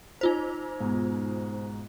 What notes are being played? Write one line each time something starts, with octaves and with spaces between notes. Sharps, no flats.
D#4 F4 C5
G#2 B2